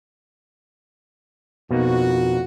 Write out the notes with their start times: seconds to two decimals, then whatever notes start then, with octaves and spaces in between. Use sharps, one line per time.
1.71 F2 B2 A#3 D#4 F#4